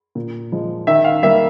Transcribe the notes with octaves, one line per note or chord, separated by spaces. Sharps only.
A#2
F3 G#3
D#3 E5
F5
G3 A#3 E5